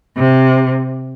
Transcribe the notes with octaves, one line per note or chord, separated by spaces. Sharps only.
C3